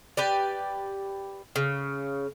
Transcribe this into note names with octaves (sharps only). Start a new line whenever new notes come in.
G4 B4 D5
C#3